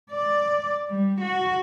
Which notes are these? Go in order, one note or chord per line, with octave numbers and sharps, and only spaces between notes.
D5
G3
F#4